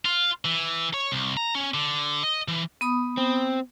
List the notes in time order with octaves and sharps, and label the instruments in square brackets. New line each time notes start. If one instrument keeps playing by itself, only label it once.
[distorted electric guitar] F4
E3
C#5
C2
A#5
C#4
D3
D#5
E3
[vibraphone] B3 B5 D#6
[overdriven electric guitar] C4